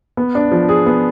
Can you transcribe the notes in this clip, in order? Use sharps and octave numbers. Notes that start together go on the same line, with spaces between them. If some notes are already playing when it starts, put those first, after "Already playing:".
B3
D4
F3
G#4
B3